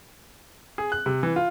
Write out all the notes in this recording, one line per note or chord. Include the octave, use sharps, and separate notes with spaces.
G#4
F#6
C3
E3
F4